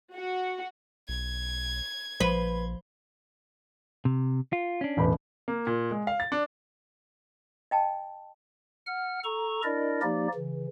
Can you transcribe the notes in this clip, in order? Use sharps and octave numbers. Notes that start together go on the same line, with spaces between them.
F#4
B1 G#6
A#1 F3 B4 C5
C3
F4
C#4 D4
E1 A1 B5
A#3
A#2
G#3
F5
A6
D4
D#5 G5 A5
F#5 F6
A4 A#5 C#6
D4 E4 A#4 D5 D#5
F3 A#3 D#4 G4 D5
C#3 E3